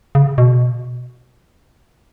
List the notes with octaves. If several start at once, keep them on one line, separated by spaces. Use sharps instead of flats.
C#3
B2